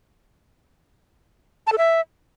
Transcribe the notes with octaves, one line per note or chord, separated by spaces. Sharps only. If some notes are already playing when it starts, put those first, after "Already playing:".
A5
A4
E5